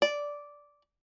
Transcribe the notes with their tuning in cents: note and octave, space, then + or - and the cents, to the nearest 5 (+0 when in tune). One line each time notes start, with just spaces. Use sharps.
D5 -10